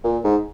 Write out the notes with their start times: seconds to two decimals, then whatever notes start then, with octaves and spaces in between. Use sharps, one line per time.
0.04 A#2
0.24 G#2